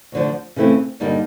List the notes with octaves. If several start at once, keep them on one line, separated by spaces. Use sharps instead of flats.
D2 D3 F3
C#3 E3 A3 C4 E4
G2 D3 G3 A#3 D#4